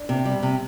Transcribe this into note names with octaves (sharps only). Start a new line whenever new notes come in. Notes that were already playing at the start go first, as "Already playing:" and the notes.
Already playing: D4
C3
G3
C3